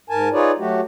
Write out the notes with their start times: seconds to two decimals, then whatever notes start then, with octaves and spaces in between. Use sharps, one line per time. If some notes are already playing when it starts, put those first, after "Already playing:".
0.10 G#2 A#4 G#5 A5
0.33 D#4 F4 G#4 B4 C#5 D5
0.59 F#3 A3 F#4 G4